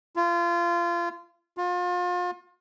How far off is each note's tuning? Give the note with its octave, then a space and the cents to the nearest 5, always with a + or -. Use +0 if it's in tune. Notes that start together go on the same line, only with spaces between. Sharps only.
F4 -25
F4 +35